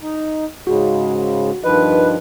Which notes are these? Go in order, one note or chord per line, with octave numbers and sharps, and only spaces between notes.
D#4
G#2 C#3 G#3 F#4
G2 D#3 F3 B4 D#5